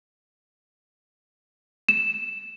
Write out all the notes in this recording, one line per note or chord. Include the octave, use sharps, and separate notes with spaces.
E7